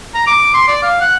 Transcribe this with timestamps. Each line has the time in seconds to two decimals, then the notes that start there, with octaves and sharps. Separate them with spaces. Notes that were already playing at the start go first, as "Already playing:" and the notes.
0.14 A#5
0.27 D6
0.54 C6
0.68 D5
0.83 F5
1.01 F#5